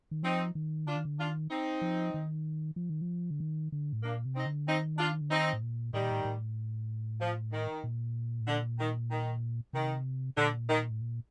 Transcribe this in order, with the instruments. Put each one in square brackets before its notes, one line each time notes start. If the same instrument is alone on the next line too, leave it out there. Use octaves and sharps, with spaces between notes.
[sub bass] D#3
[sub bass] F3 [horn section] C4 D#4
[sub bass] D#3
[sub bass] D3 [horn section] D4 F4
[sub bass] D#3
D3
[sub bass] D#3 [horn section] D4 F4
[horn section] C4 D#4
[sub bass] F3
D#3
F3
D#3
F3
D3
D#3
D3
A2
[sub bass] A#2 [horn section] A#3 D4
[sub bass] C3
[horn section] C4 D#4
[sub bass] D3
[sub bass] D#3 [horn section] C4 D#4
[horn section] D4 F4
[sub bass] D3
[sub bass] D#3 [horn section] C4 D#4
[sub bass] A2
A#2
[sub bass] A2 [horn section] D#3 G3
[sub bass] A#2
A2
A2
[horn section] F3
D#3
[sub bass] A#2
A2
[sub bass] A#2 [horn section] D3
[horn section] D#3
D#3
[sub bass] C3 [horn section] D#3
[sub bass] A#2 [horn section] D3
[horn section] D#3
[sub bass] A2
A#2